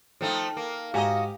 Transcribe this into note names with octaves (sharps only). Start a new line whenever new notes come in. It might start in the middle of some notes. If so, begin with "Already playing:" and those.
F3 A3 D#4 A4 G5
A#3
G#2 F#4 G4 D#5 F5 G#5 A#5